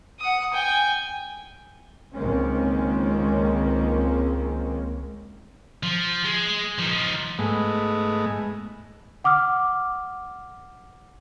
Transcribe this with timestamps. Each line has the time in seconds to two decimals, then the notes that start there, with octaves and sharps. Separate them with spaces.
0.20 F#5 D#6
0.53 G5 G#5
2.14 C#2 D#3 G#3 A#3 C4 C#4
5.83 F3
6.24 G#3
6.79 F3 D#4
7.39 G#2 G#3 A3 B3
9.24 F#5 D6 D#6 F6